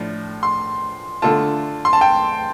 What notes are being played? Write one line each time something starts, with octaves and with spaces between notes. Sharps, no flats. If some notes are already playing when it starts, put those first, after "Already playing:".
Already playing: A2 F3 D4
C6
D3 A3 F4 A5
C6
A5
G5